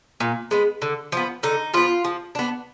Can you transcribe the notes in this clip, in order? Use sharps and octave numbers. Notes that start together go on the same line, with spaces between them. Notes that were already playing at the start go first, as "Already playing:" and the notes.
A#2
G#3 B3
D3
F3 B3
D3 D#4
F3 B3 F4
F3
B3 D4